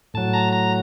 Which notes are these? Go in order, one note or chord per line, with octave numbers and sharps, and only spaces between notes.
A2 F#3 A5
A#5
A#5